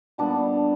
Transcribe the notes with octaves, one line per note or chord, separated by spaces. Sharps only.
A#2 G3 B3 D4